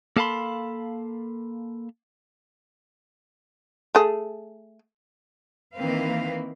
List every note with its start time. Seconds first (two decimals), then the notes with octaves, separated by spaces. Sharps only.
0.17 A#3 A4 F5 A5 B5 C6
3.95 A3 G#4
5.75 D#3 E3 A#3 C4 B4 F5